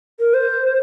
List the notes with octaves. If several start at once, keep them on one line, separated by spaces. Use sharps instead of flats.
A#4
C5